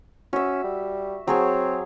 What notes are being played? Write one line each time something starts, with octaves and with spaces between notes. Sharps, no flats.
C#4 F#4 E5
G3
F#3 C4 G#4 C#5